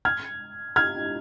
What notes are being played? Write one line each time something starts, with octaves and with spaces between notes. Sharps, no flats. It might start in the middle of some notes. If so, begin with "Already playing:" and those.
F6 G#6
F6 G#6